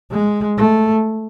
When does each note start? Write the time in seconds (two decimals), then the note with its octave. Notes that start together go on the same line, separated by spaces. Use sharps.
0.11 G#3
0.58 A3